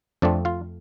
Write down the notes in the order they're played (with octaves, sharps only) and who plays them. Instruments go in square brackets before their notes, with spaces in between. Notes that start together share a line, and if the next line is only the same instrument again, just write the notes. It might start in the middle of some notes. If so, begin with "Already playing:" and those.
[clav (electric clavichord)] F2 F3 A3 C4 D4 D5
F4 F5